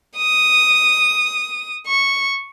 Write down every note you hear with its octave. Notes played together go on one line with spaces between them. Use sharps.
D#6
C#6